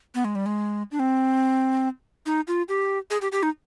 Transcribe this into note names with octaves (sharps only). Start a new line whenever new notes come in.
B3
G#3
G3
G#3
D4
C4
D#4
F4
G4
G#4
G4
G4
D#4